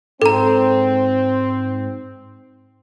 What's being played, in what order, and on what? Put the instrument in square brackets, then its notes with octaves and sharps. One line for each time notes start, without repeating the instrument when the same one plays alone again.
[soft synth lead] G#2 [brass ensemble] C4 [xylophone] A4 A#5